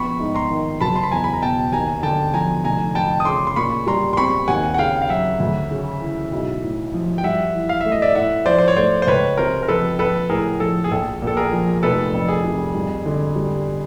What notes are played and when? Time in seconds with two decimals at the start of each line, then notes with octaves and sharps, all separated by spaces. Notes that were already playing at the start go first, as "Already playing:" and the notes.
Already playing: A#1 B3 B5 C#6
0.19 G#2
0.34 A#5 C6
0.50 D#3
0.81 F#1 A5 B5
0.96 C6
1.03 B5
1.12 E2 G#5 A#5
1.24 B5
1.33 A#5
1.42 B2 G5 A5
1.72 D#2 G#5 A#5
2.03 D3 G5 A5
2.33 F3 G#5 A#5
2.64 F1 G#5 A#5
2.95 F2 G5 A5
3.20 D#6
3.25 C#3 C6 D6
3.47 C6
3.56 A#2 B5 C#6
3.87 G3 A#5 C6
4.13 C6
4.17 C4 B5 C#6
4.48 D#2 F#5 G#5
4.74 F#5
4.78 C#3 F5 G5
5.02 F5
5.09 F#3 E5 F#5
5.40 D2
5.71 C#3
6.01 E3
6.31 B1
6.62 A2
6.94 F3
7.18 G5
7.24 G2 E5 F#5
7.55 E3
7.69 F5
7.81 A3 E5
7.92 D#5
8.02 D5 E5
8.15 A2 E5 F#5
8.46 F3 C5 D5
8.59 C5
8.68 C#5
8.77 A3 C5 D5
9.02 C5
9.07 C#2 B4 C#5
9.37 C3 A#4 C5
9.63 A#4
9.68 F3 A4 B4
9.99 A#1 A4 B4
10.29 A2 G#4 A#4
10.60 F3 A4
10.84 G#4
10.91 A#1 A4
11.22 A#2
11.27 A4
11.36 G#4 A#4
11.53 F3
11.83 F1 A4 B4
12.14 F2
12.28 G#4
12.44 C3
12.74 G2
13.06 D3
13.36 G3